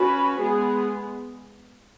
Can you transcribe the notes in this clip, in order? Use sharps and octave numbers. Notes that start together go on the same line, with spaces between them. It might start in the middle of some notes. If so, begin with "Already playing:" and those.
Already playing: C#4 F#4 B4
G#3 B3 G#4